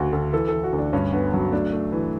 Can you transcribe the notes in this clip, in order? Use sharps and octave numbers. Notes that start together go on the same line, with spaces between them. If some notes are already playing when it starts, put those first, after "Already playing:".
Already playing: D2 C#3 F#4
D2 A4
E3 A4
E3 A4
F#4
D2
D4
G2 C#4
D3 B3
F#3 C#4
A3 D4
A3
E3